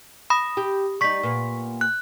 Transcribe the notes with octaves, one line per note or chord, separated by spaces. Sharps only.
B5 D#6 A#6
G4
G3 D#4 C#6 B6
A#2 B3
F#6